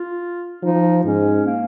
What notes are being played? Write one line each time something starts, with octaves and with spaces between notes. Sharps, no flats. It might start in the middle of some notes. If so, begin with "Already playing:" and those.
Already playing: F4
F3 D#4
G#2 C#4
A#3